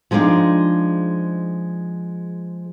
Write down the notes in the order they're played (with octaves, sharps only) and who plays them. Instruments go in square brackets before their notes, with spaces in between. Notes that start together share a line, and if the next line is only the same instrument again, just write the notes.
[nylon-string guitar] F3 G#3 B3 D4 D#4 F4